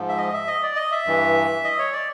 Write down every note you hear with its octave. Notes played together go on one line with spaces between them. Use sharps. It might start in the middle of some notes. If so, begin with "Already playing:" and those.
Already playing: G#2 F3
E5
D#5
E5
D#5
D5
D#5
E5
G2 E3
D#5
C#5
D5